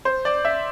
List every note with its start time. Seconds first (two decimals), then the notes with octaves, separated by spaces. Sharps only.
0.05 C5
0.25 D5
0.45 E5